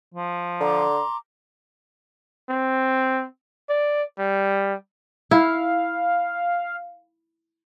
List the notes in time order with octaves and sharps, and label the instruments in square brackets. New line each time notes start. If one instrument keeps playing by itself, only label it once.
[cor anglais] F3
[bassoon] D3 [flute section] A#5 C6 D6
[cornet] C4
D5
G3
[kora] E4 [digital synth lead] F5